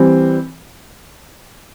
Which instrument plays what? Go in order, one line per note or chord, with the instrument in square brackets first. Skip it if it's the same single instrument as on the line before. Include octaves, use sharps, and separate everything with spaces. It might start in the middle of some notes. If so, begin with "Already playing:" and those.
Already playing: [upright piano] E3 G3 C4